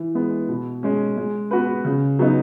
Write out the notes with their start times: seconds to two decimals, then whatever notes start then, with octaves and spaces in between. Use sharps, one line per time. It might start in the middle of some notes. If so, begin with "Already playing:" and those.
Already playing: E3
0.15 G#3 B3
0.49 B2
0.83 G#3 C#4
1.17 G#3
1.51 B3 F#4 B4
1.85 C#3
2.19 F#3 B3 D#4